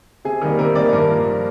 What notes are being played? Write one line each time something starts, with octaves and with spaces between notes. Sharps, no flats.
C3 G#4
D#3 G3 A#3
C3 A#4
D#3 G3 A#3 D5
G2 A#4
F3 A#3